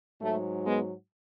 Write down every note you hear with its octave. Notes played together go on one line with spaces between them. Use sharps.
G#2 F#3 A3
G#3 B3